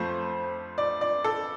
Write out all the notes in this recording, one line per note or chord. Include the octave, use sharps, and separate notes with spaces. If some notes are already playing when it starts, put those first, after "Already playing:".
Already playing: F2 F3 A3 C5
D5
D5
A4